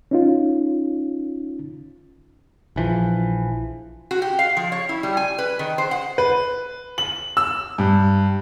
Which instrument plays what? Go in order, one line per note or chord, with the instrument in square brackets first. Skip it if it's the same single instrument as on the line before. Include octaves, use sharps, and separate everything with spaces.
[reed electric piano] C#4 D#4 F4
[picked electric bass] A#1 E3 F3
[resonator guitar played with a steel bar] F#4
G4
F5
F3
C#5
E4
G3
G#5
B4
D#3
C5
F#5
[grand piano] B4
F#7
E6
G2